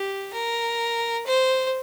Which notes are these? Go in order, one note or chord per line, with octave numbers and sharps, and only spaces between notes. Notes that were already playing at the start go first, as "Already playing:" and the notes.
Already playing: G4
A#4
C5